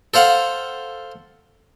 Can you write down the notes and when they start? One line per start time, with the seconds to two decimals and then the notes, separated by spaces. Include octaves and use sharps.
0.14 A4 C5 F5 F#5